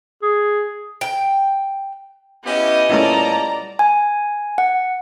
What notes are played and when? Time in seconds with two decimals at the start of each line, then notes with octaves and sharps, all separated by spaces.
0.22 G#4
1.01 G5
2.44 B3 C#4 E4 G4 D#5
2.90 A#2 G3 A3 C#4 E4 D5 A5 A#5
3.79 G#5
4.58 F#5